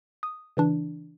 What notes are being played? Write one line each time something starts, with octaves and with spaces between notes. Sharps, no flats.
D#6
C#3 E3 D4